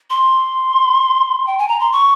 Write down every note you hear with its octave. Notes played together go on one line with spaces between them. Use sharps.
C6
G5
G#5
A#5
C6
C#6